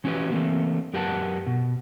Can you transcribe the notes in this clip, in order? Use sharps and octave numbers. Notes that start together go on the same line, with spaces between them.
E3 C#4 E4 F#4 G4 B4
E3 A3 A#3 C4
F#2 G4 A#4 B4 F#5 A5
B2